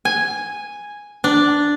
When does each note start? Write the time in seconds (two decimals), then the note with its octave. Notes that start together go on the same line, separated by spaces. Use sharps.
0.05 G#5
1.24 D4